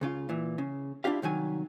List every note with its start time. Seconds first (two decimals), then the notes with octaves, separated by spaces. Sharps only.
0.01 C#2 C#3 F4
0.29 A#2 E3
0.58 C#3
1.04 D4 E4 F4 G4 F5
1.22 C2 D#3 F#3 G#5